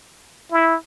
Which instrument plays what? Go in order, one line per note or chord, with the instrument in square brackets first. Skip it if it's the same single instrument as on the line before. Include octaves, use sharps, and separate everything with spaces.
[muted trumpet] E4